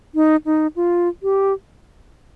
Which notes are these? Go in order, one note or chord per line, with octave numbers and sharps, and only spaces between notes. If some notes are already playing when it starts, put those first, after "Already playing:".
D#4
D#4
F4
G4